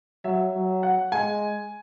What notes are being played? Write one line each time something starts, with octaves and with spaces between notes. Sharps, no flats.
F#3 E5
F#3
F#5
G#3 G#5